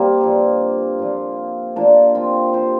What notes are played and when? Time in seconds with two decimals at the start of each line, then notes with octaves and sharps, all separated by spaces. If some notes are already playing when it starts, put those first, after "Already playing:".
Already playing: G3 A#3 C4
0.21 G2 F3
0.99 A#2 F3
1.76 A#2 F3 A#3 D4
2.15 C4 F4
2.53 F3 G4 C5